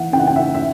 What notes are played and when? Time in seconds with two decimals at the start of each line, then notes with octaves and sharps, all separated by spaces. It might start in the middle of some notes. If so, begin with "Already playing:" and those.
Already playing: E3 F#5
0.12 C#3 G5
0.20 F#5
0.27 G5
0.36 E5
0.55 E5